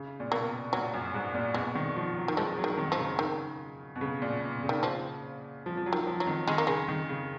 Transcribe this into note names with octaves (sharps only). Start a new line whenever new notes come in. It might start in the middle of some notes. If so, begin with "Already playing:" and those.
Already playing: C#3
A#2
B2 A#3
A#2 F#3
F#2
G#2
A#2
B2 G#3
D#3
F3
F#3
D#3
F3 G#3
F#3
D#3
D#3
F3
C#3
D#3
B2
C#3
A#2
B2
C#3
D#3
F3
F3
F3
F#3
D#3
F3
F#3
D#3
D#3 G#3
A#3
C#3 G#3
D#3
C#3